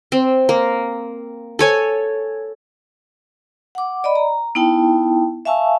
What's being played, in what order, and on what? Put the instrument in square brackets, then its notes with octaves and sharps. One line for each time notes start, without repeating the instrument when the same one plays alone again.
[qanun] C4
A#3
A4 C#5 G#5
[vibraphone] F#5 D6
D5 D#5 B5
A#5
B3 D#4 E4 G5 A5
E5 F5 G#5 A5 C#6 E6